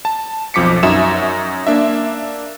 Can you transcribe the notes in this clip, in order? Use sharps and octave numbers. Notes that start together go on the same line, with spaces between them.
A5
B1 F2 F3 D6 B6 C#7
F#2 D#4 F#4 E5 D#6 E7
A#3 D4 E5